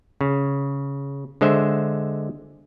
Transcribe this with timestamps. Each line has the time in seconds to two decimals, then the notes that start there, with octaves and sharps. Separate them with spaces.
0.21 C#3
1.41 D3 G#3 C5 E5